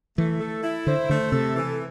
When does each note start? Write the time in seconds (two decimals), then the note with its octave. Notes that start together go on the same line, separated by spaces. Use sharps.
0.18 E3 A3
0.40 A4
0.63 E4
0.87 D3 C5
1.09 D3 A3
1.32 C3 A4
1.56 E3